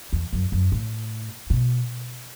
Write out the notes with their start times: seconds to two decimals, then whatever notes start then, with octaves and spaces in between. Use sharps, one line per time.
0.13 E2
0.33 F#2
0.52 F#2
0.72 A2
1.50 B2